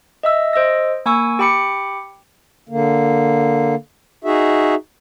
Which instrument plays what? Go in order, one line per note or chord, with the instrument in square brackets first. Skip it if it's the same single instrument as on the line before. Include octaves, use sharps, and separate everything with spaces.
[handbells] D#5 E5 E6
C5 D#5 E6 A#6
A#3 G#5 C#6 E6
G4 G5 B5 D6 C#7
[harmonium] D3 A#3
D#4 F#4 G#4 E5